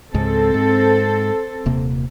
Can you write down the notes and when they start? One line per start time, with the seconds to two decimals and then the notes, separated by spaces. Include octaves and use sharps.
0.14 C#2 G#2 C4 A4
0.54 G#2
1.66 D#1 C3 A#3